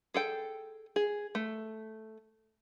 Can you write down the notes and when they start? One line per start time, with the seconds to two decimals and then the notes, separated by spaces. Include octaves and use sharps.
0.14 G#4 A4 G5
0.96 G#4
1.35 A3